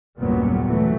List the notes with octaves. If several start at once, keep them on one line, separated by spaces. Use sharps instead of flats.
F#1 D#2 A#2 F#3 G3 B3
E3 F#3 A3